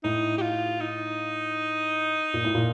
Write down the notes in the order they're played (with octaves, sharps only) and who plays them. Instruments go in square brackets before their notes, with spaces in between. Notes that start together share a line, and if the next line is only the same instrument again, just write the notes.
[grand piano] A2 [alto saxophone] D#4
[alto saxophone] G4
F4
D#4
[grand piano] A#2
A2
A#2